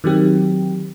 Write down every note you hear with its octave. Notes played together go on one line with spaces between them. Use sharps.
D#3 F#3 C4 G4